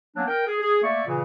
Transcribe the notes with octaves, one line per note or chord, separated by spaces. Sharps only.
F#3 A#3 B3 C#4 D4
A#4 G5
G#4
G#4
A3 A#3 D5 E5 C#6
A#2 C#3 E3